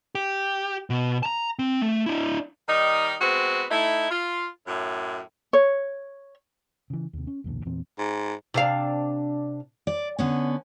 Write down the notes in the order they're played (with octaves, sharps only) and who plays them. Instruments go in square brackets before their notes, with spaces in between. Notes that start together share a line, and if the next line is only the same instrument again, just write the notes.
[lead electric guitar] G4
B2
A5 A#5
C4
A3
D4 E4
[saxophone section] D#3 G3 D#4
G#3 B3 C4 F#4
A3 D#4 E4
F4
F#2 A2
[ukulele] C#5
[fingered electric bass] C#3 E3
D#2 C3
C#4
B1 E2 A#2 D3
E2 A#2 E3 C4
[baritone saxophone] G#2
[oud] C3 D4 F5
[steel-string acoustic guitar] D5
D3 B3 C#4